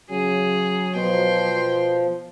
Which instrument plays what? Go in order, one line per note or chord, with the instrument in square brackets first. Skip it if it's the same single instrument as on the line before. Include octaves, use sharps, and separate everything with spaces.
[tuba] C#3 [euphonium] F#3 [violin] G#4
[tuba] B2 [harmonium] F3 [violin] G5 C6